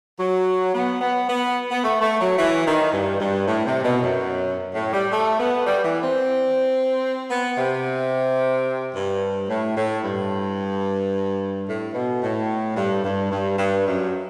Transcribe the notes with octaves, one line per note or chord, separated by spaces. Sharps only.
F#3
B3
B3
B3
B3
A3
A3
F#3
E3
D#3
G2
G2
A2
C3
B2
F#2
A2
G3
A3
B3
G3
E3
C4
B3
C3
G2
A2
A2
G2
A2
B2
A2
G2
G2
G2
G2
F#2